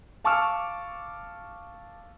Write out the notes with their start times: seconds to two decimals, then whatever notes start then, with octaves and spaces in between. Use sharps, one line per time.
0.24 F5 A5 C#6 D6 E6 F6